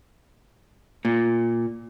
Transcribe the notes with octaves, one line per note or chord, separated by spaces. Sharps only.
A#2